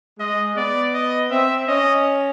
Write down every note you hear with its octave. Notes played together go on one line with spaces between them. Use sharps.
G#3 D#5
B3 D5
D#5
C4 E5
C#4 D#5